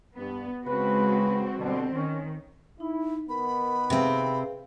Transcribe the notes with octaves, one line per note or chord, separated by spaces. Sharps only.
G2 B3
C#3 G#3 C4 F#4 B4
B2 D3 G3 C4
D#3 C#4
D#4 E4
D#3 B3 A#4 B5
C3 C4 G#4 B4 F5